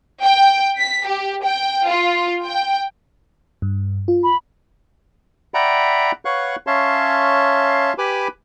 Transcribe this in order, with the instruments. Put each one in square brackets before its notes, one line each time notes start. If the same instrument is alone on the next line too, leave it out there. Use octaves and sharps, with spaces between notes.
[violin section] G5
B6
G4
G5
F4
G5
[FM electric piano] G2
F4
[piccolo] B5
[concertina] D5 E5 F#5 G5 A#5 B5
B4 C#5 F5 F#5 C#6 F#6
C#4 C#5 E5 F5 A5 C6
G4 B4 G#5 B5 D6